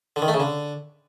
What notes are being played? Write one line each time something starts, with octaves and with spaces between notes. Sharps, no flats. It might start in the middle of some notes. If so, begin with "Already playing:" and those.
D3
D#3
A3
C#3
D3